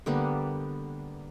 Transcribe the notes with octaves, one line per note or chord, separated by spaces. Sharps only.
D3 G3 A#3 B3